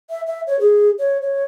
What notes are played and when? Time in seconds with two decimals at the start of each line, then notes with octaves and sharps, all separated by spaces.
0.10 E5
0.27 E5
0.47 C#5
0.60 G#4
0.99 C#5
1.22 C#5